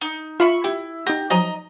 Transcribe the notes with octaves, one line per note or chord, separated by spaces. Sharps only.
D#4
F4 E5 B5 C#6
E4 G4
D#4 G4 F#5 A#6
F3 F#3 C#4 D#5 A#5